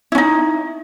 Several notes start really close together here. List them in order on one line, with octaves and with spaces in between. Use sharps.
E4 C#4 D#4